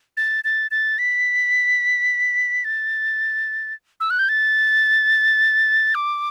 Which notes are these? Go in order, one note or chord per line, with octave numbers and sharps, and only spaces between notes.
A6
A6
A6
B6
A6
E6
F#6
G6
A6
D6